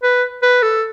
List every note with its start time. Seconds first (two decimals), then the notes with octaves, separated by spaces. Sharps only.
0.03 B4
0.42 B4
0.63 A4